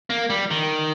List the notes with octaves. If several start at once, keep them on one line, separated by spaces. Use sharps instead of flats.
A#3
G3
D#3